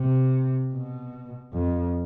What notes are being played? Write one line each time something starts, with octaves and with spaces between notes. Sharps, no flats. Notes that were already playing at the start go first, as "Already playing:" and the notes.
Already playing: C3
B2
F2